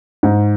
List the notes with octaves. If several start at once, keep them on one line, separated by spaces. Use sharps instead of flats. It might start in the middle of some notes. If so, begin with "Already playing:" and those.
G#2